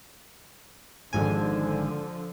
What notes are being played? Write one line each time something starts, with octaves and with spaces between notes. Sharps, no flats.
G#1 G#2 D3 F3 G#5